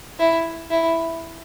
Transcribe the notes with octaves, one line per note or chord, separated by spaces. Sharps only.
E4
E4